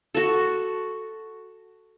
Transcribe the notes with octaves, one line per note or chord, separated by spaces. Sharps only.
F#4 A4